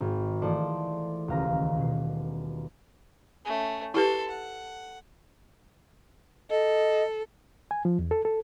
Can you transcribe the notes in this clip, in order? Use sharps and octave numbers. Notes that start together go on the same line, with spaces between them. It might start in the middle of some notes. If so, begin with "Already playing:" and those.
G#1
E3 F3 A3 A4 C5 D5
D#1 C#2 F5 A#5 A#6
B2 C7
A3 C#4
E4 G4 A4 B4 C6
F#5
A4 D#5
G#5
F3
E2
A4
A4